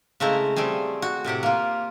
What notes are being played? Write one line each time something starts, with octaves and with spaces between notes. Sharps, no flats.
C#3 G#3 A3 C4 E4 A#5
G3 A3 C4 G#4
F#4
A2 C3 G4 F#5
A#3 F4